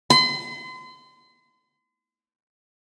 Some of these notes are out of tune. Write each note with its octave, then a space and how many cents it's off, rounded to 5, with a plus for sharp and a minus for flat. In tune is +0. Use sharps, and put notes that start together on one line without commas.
C6 -40